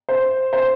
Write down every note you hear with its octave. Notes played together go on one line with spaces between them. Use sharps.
C5
C5